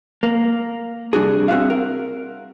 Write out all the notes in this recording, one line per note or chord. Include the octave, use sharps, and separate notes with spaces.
A#3
C3 G3 D4 F#4 G#4
C4 F4 F#4 G#4 E5 F5
A#4